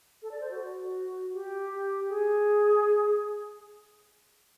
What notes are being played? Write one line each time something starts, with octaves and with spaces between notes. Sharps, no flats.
A4
D5
C5
F#4
G4
G#4